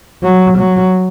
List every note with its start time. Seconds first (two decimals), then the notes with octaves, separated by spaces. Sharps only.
0.23 F#3
0.58 F#3